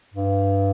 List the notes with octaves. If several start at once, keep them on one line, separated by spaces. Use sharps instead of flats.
G2